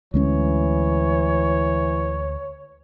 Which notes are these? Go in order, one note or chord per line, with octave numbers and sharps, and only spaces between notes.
D2 E3 G#3 C#4 C#5